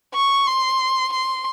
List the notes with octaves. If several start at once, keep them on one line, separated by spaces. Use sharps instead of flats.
C#6
C6
C6